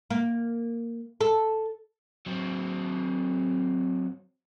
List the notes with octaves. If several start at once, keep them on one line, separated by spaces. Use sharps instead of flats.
A#3
A4
F#3 C4